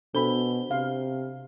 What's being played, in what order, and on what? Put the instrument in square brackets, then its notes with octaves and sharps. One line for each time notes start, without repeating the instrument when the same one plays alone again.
[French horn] B2 [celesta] D4 C5 G7 [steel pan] A4 B5
[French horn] C3 [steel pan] F5